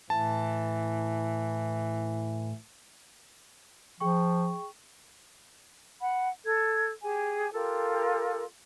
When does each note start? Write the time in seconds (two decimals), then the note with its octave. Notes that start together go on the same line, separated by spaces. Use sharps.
0.10 A2 E3 A5
4.00 F3 G#4 G5 C#6
6.00 F#5 B5
6.45 A4 G#6
7.02 G4 G#4 G#5
7.53 F4 G4 A4 A#4